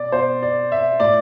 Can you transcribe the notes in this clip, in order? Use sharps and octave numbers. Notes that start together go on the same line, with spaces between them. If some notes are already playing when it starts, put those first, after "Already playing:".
Already playing: B2 D5
B2 C5
D5
E5
A2 D5